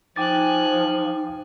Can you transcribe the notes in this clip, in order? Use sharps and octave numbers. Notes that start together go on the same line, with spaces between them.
F3 D#4 G5 G#5 D6 F#6 A6